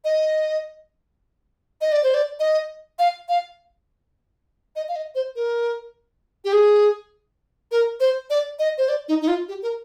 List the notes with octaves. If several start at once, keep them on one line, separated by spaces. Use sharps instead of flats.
D#5
D#5
D5
C5
D5
D#5
F5
F5
D#5
F5
D#5
C5
A#4
G4
G#4
A#4
C5
D5
D#5
C5
D5
D#4
D#4
F4
G4
A#4